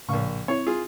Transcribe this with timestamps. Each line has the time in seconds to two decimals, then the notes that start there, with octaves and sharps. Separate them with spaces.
0.09 A#1 A2 C#3 F5 C#6
0.48 C4 E4 C#5
0.66 F4 G#4